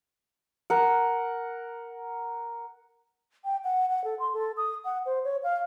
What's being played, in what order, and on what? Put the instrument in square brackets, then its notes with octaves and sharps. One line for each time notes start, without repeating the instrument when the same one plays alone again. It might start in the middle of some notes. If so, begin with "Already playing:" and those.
[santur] A#4 F#5
[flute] G5
F#5
F#5
A4
C6
A4
D#6
F#5
C5
C#5
F5